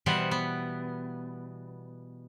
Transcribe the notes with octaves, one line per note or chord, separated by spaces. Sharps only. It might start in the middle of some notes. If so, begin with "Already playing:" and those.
B2 E3 G3 B3 C5 F#5
B3